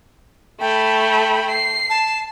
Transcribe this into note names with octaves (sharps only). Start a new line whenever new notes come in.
A3 G5 B5
C7
A5